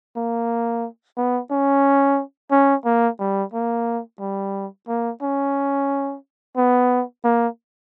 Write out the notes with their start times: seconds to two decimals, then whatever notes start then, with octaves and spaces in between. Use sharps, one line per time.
0.16 A#3
1.17 B3
1.51 C#4
2.51 C#4
2.85 A#3
3.20 G3
3.54 A#3
4.20 G3
4.88 A#3
5.22 C#4
6.57 B3
7.24 A#3